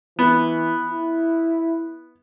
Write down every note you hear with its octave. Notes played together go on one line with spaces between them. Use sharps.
E3 B3
E4